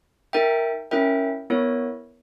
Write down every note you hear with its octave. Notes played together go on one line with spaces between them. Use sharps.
D#4 A#4 E5 G5
C#4 E4 A#4 E5 G5
B3 E4 A#4 C#5